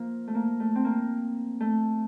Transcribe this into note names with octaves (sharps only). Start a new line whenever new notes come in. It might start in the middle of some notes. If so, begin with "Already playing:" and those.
Already playing: F3 A#3
A3
A#3
A3
C4
A#3
A3